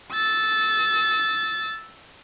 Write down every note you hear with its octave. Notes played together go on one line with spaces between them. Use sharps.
E6 A6